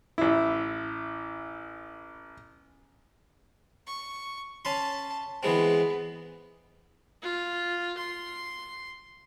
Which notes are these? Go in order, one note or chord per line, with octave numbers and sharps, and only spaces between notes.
A1 E4
C#6
C#4 A5 B5 C6
E3 G#3 B3 C4
F4
C6